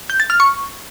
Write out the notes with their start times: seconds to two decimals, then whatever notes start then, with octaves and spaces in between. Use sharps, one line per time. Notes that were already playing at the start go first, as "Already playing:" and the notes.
0.10 G6
0.20 A6
0.30 F6
0.40 C#6